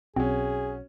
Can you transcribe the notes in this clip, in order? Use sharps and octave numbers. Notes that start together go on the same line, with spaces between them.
B1 C4 C#4 F#4 G#4